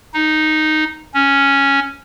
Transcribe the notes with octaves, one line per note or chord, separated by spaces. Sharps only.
D#4
C#4